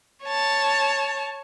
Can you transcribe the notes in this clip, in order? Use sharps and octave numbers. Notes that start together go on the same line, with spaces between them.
C#5 A5